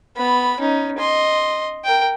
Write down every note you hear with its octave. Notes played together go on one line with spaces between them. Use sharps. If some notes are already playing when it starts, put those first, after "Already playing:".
B3 B5
C#4 D#4
D#5 C6
A#4 G5